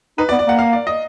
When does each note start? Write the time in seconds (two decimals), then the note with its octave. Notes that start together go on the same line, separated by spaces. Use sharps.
0.18 D#4 B4
0.29 D5
0.32 B3
0.39 D5
0.46 A#3 F#5
0.59 F5
0.73 D5
0.87 D#5